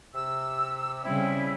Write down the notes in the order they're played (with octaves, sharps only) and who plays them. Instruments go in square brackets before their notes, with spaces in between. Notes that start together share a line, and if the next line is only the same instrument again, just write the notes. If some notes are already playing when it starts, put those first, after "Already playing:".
[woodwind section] C3 E6
[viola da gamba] C#3 G3 [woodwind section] C4 E4